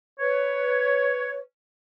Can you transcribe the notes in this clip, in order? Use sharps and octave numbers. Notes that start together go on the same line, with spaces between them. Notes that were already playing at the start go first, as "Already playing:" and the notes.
B4 C#5